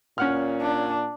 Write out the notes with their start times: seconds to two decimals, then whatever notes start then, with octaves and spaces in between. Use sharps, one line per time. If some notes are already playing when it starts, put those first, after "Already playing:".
0.18 A#2 C#4 F#5 F6
0.61 D4